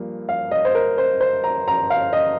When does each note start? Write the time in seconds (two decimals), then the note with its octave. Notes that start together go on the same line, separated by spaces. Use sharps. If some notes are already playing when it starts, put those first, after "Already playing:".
Already playing: G2 F3 A#3
0.29 F5
0.51 D#5
0.65 C5
0.75 A#4
0.98 C5
1.21 C5
1.44 A#5
1.68 A#5
1.90 F5
2.13 D#5